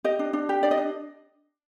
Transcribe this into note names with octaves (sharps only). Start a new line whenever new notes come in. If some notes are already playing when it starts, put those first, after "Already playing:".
G4 D#5
D4
D4
G4
D4 D5
D#5
D4